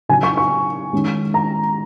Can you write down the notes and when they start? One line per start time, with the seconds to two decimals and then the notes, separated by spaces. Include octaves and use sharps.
0.09 C#3 F#3 C#4 G#5
0.23 C#6
0.37 C#6
0.93 D#3 G#3 C#4
1.34 A#5